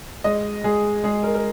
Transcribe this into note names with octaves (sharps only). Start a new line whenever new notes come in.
G#3 D#5
G#3 G#4
G#3 G#4
A#4
A#4